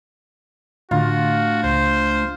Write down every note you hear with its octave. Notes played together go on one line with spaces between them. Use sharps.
A2 D3 A3 D4 F4 F#4
C#2 C5